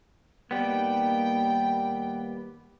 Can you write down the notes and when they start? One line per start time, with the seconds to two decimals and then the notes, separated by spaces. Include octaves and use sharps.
0.51 D#2 G3 A#3 B3 G5